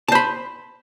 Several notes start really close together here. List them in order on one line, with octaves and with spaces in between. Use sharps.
A5 C5 B5